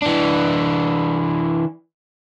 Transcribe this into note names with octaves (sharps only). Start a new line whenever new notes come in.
E3 D4